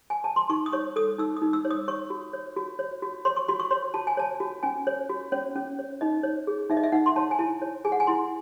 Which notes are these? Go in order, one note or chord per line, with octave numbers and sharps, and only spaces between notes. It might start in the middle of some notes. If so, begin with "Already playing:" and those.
G#5
A5
C6
D#4 C#6
D#6
C#5 C#6
A4 D#6
D#4 E6
D#6
D#4
E6
C#5
D#6
C#5 C#6
F#4
C#5
F#4
C#5
F#4
C#5 C6
C#6
F#4 C6
C#6
C#5 C6
F#4 A5
G#5
C#5 A5
F#4
C#4 G#5
C#5
F#4
C#4 C#5
C#4
C#5
D#4 D#5
C#5
G#4
D#4 E5
D#5
E5
D#4 F#5
C6
C#5 A5
G#5
E4 A5
C#5
G#4 G#5
F#5
G#5
E4 C6